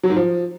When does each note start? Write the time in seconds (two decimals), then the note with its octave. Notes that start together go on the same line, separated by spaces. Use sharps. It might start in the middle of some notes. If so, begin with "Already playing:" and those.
0.03 F#3
0.10 G#2
0.16 F3